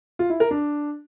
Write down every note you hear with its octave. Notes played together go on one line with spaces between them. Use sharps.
F4
E4
A#4
D4